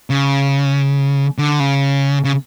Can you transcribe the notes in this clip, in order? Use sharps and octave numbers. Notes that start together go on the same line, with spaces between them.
C#3
D3
C#3
C#3